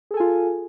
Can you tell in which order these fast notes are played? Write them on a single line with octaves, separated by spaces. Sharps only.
G#4 A4 G#5 F4